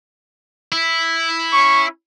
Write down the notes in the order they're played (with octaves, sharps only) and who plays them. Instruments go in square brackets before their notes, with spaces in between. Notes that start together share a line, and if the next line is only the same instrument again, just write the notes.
[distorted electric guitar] E4
[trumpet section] C#4 C#6